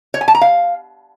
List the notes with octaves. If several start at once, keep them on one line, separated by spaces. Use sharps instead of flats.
C#5
G#5
A5
A#5
F5